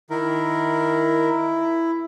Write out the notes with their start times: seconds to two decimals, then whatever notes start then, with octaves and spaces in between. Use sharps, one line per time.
0.10 D#3 E4 A#4